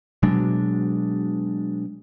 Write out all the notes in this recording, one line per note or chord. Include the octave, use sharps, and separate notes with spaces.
B2 F#3 G#3 D4